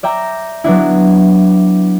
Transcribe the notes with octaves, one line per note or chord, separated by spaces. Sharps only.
D5 E5 G5 A#5
F#3 B3 D4 E4